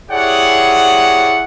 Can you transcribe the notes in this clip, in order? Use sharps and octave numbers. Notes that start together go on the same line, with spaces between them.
E4 G4 G#4 C#5 D5 F#5